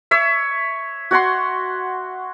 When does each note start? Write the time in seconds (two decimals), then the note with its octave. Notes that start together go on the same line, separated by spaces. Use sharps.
0.11 C#5 E5
1.11 F#4 C#5 F#5 C6